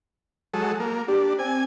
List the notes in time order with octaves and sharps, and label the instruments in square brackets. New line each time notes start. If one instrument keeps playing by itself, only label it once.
[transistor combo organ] F#3 G#3 A4
A#3
[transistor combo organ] D4 [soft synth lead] G4
[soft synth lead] C4 [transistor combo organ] G#5